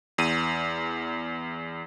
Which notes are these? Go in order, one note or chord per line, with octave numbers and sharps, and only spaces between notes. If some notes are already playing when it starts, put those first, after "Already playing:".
E2 D#7